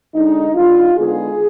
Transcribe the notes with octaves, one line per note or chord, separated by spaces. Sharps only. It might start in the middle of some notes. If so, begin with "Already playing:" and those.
D3 G#3 D4 D#4
D#3 G3 D4 F4
D3 G#3 B3 D#4 G#4